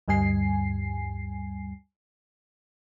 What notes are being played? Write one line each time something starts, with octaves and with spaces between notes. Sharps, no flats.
D2 G2 G3 G#5 C7